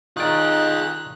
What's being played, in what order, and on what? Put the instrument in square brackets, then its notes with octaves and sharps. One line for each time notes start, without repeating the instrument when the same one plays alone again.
[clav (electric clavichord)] D#3 D5 [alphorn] D#4 [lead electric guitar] F4 G#4 [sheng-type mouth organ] F#6